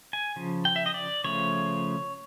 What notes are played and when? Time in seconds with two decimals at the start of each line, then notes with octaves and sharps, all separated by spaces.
0.13 G#5
0.36 C#3 F3
0.65 G5
0.76 E5
0.86 D#5
0.94 D5
1.24 C#3 F3 A3 C#5